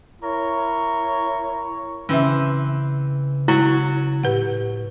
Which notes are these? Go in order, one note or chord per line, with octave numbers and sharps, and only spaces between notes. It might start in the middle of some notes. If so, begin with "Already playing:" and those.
E4 A#4 C#5
C#3 E3 C4 C#4 E5
F#3 E4 F#4
A2 G4 B4 F#5